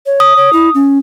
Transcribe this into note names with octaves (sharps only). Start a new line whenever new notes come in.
C#5
D#6
C#5
E4
C#4